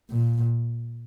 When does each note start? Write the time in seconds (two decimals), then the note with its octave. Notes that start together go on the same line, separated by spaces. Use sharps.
0.10 A#2